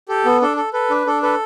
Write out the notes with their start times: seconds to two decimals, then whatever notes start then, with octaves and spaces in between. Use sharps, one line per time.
0.09 G4 A4
0.25 B3
0.41 D4 A4
0.57 A4
0.73 A4 B4
0.90 D4
1.06 D4 A4
1.22 A4 B4